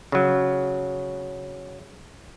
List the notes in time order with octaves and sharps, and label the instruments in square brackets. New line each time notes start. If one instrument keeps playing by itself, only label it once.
[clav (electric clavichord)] C#3 F#3